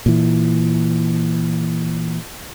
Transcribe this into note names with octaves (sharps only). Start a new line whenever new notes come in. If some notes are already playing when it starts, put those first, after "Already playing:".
A#2 E3